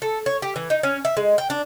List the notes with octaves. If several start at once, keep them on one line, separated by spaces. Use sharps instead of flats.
A4
C#5
G4
E3
D#4
C#4
E5
G#3
G5
D4